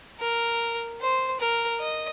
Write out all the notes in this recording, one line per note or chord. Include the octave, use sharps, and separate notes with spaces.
A#4
C5
A#4
D#5